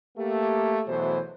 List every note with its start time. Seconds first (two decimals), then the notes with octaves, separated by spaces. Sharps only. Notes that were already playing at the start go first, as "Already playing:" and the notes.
0.17 A3 A#3 G4
0.87 E2 B2 E3 F#3 A3 C5